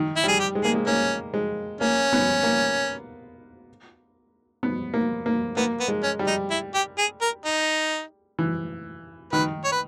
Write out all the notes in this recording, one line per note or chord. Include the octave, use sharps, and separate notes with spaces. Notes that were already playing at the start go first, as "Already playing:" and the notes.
Already playing: D#3
E4
G3 G#4
G4
G#3
A#3 G#4
G#3
A#3 C#4
G#3
A#3 C#4
B3
A#3
B3
A#3
A#3
A#3 B3
B3
G#3
C#4
G3
D#4
E4
G4
G#4
A#4
D#4
E3
D#3 B4
C#5
B4